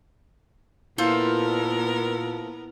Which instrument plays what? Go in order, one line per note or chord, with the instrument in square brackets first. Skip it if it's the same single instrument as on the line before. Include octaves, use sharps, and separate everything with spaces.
[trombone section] A#2 [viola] B3 A#4 [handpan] E4 [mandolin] F4 A4 C5